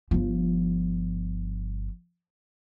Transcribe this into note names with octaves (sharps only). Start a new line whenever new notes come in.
G1 F3